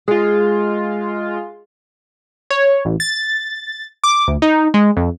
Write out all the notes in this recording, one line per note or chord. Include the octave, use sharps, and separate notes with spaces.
G#3 F4 G#4
C#5
A1
A6
D6
D2
D#4
G#3
F2